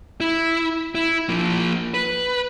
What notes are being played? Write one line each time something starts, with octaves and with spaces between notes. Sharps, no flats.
E4
E4
F3 A#3
B4